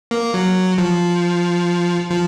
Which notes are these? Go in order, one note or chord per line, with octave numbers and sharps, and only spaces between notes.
A#3
F#3
F3
F3